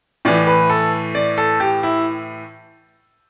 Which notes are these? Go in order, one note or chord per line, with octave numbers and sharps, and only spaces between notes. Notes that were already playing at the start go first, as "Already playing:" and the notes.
A2 E3 D5
B4
A4
D5
A4
G4
E4